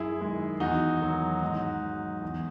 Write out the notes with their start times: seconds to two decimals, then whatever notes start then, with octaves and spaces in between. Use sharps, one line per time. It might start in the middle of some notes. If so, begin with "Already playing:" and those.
Already playing: F#2 E4 G#4
0.21 D#3 G#3
0.60 E2 D#4 F#4
1.01 D#3 F#3
1.42 G#2
1.82 F#3
2.22 E2